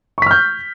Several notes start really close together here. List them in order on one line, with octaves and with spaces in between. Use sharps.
C#6 B6 F6 G6